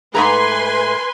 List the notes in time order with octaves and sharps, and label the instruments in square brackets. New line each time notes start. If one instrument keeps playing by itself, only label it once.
[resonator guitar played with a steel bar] G#2 A3 A#5 [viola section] B4 G#5 C6